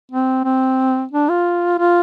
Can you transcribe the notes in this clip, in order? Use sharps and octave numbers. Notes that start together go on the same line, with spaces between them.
C4
C4
D4
F4
F4